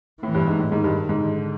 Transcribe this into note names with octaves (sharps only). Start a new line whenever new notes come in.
A2 E3
G2
G#2
A2
G#2 D#3
G2
G#2
D3